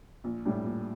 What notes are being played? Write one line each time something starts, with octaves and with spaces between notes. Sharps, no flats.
A#1
A2 G3 D4
A#1